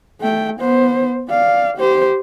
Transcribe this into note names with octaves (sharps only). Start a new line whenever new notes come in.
A3 G5
B3 C5
D5 F5
G4 C5